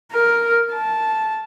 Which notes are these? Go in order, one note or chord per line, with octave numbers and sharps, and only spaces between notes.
A#4
A5